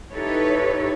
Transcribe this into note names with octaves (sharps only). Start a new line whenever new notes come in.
D#4 E4 G4 A4 B4 C#5